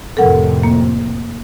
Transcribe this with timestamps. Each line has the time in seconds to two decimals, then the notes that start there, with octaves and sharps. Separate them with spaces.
0.17 F2 A2 C3 A4 A#4 F#5
0.63 A#3